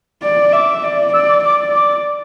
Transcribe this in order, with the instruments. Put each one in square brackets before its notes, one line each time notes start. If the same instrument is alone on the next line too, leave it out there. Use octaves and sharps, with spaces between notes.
[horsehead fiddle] D5
[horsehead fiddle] E5 [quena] D6
[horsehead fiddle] D5
[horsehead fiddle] D5 [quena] E6
[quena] D6
[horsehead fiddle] D5 [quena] D6
[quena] D6